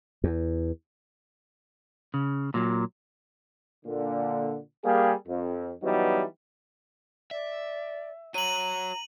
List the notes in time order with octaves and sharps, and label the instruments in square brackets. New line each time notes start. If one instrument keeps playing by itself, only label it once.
[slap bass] E2
[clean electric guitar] C#3
A#2 F#3
[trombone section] A#2 D3
G3 A#3 G#4
F2
E3 F#3 G3 B3 D#4
[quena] D5 [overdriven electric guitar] E5
[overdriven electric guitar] F#4 C#5 [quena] A#5 [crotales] D#7 F#7